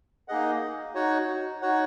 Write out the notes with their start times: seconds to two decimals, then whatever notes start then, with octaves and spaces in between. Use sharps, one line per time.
0.28 A#3 D#4 G#4 D#5 F#5
0.95 D#4 F#4 C#5 F#5
1.62 D#4 F#4 C#5 F#5